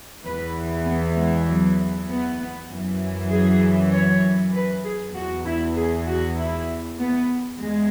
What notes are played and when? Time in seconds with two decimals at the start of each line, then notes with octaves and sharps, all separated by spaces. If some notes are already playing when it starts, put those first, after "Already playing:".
0.24 E2 E3 B4
0.86 B3
1.16 G#3
1.48 F#3
2.09 B3
2.70 F#2 E3
3.31 G#4
3.93 C#5
4.54 B4
4.84 G#4
5.15 E2 E3 F#4
5.46 E4
5.77 G#4
6.08 F#4
6.38 E4
7.00 B3
7.60 E2 G#3